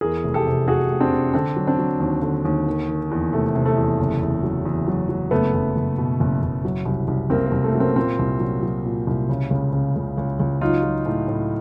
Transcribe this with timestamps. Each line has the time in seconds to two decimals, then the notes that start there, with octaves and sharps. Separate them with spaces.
0.01 E2 G#4 A#4
0.24 F1
0.34 G4 A4
0.46 C3
0.68 F1 F#4 G#4
0.90 F1
1.00 C4 D4
1.12 C3
1.34 D3 C4 D4
1.56 F#3
1.67 C4 D4
1.79 F#3
2.00 D#2
2.22 D3
2.45 D#2
2.67 D#3
2.88 D#3
3.11 E2
3.33 C3 A3
3.55 C3
3.66 A3
3.77 E2
3.99 F#1
4.22 E2
4.43 F#3
4.65 E2
4.88 F#3
5.09 F#3
5.31 F#1 A3 B3
5.54 F#1
5.76 F#1
5.98 B2
6.20 F#1
6.42 F#1
6.65 F#3
6.86 C2
7.08 C2
7.30 C2 A#3 C4
7.46 A#3
7.52 C2
7.64 A3
7.75 F#3
7.80 A#3 C4
7.96 A#2 A#3 C4
8.19 C2
8.40 F#3
8.63 F#3
8.85 A#2
9.07 C2
9.29 C#3
9.50 C#2
9.73 C#3
9.96 C#2
10.18 C#2
10.40 C#2
10.61 F#3 D#4 F4
10.83 F#3
11.06 A2
11.28 A2